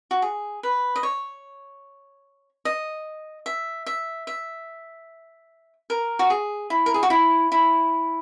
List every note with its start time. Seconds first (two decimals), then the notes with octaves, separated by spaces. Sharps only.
0.11 F#4
0.22 G#4
0.63 B4
0.96 D#5
1.03 C#5
2.65 D#5
3.46 E5
3.86 E5
4.27 E5
5.90 A#4
6.19 F#4
6.30 G#4
6.70 E4
6.86 A#4
6.94 G#4
7.03 F#4
7.10 E4
7.52 E4